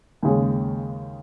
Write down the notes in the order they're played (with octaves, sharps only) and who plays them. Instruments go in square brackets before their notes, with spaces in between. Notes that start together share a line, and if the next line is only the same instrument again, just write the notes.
[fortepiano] D#2 C#3 G#3